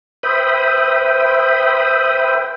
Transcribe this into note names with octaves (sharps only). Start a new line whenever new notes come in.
B4 C5 E5 G5 B5 D#6